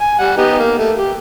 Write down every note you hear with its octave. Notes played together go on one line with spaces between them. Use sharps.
G#5
G3 F#5
B3 D#4 G4
A#3
A3
G4